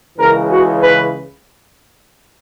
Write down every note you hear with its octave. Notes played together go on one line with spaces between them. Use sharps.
C#2 C#3 E3 A#4
F#4
B4